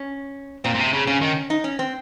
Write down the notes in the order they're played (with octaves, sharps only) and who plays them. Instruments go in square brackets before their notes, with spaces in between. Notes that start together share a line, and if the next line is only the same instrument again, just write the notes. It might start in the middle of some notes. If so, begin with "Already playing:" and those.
Already playing: [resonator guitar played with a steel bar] C#4
[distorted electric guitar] A#2 [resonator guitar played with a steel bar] C4
[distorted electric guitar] A#2
C3
C#3
[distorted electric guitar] C#3 [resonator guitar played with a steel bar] C#4
[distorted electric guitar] D#3
[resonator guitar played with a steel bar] D#4
C#4
C4